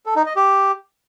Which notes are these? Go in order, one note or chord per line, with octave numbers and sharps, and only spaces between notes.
A4
D#4
D#5
G4